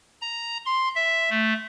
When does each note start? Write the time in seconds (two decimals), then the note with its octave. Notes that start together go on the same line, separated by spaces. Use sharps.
0.22 A#5
0.66 C6
0.95 E5
1.30 A3